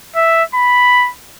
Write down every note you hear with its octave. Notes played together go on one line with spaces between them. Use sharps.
E5
B5